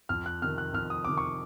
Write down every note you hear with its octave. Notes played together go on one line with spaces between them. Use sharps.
F2 F6
F#6
C3 D#3 F6
F#6
F2 F6
D#6
C3 D#3 D6
C#6